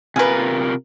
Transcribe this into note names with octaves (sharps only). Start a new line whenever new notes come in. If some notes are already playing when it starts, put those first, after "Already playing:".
C3 F4 G#4 A#4 B4